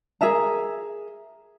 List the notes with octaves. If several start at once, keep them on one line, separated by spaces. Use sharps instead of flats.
G#4 A#4 E5 A#5